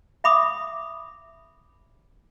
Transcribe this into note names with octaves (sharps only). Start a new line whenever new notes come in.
E5 B5 D6 D#6